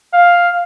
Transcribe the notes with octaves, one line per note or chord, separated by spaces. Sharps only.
F5